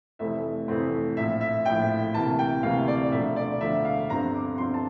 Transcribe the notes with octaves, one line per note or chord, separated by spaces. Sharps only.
F1 F2 E3 A3 C4 E5
F1 F2 E3 A3 C4
A#1 A2 F3 E5
E5
A#1 A2 F3 G5
D2 C3 E3 A#3 A5
G5
D2 C3 E3 A#3 F5
D5
E1 D2 D3 F3 E5
D5
E1 D2 D3 F3 E5
F5
G1 G2 D3 F3 C4 A#5
D6
G1 G2 D3 F3 C4 C6
A5